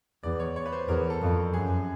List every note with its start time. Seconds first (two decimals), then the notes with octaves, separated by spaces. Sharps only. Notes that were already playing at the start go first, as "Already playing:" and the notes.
0.23 E2 D5
0.40 C#5
0.56 C#5
0.66 B4
0.72 C5
0.88 E2 A#4
1.10 A4
1.21 F2
1.54 F#2 G#4